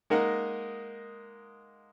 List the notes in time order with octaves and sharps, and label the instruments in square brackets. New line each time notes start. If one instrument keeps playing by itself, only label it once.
[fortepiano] G#3 A#3 D#4 A#4 F#5